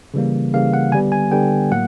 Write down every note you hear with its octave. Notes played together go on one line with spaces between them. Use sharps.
C#3 E3 G3 A#3
C#3 E3 G3 A#3 F5
F#5
D3 G3 B3 G#5
G#5
D3 G3 B3 G5
A2 F#3 A#3 F#5